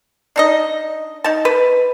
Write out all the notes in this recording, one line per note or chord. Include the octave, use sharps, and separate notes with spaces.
D4 D#4 D#5
D#4 A5
B4